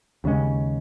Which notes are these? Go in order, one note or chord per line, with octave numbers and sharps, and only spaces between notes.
D#2 C#3 G#3 C#4